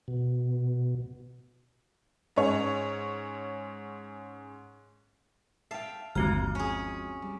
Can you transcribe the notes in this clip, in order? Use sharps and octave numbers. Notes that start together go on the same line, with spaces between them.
B2
G#2 C#4 C#5
E5 F5 G5 A5
G1 D#2 F3 G#3 C4 F#4 A#5 F6
C#4 G#4
G3